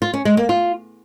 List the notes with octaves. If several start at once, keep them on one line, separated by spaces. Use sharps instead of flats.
F4
C#4
G#3
A#3
F4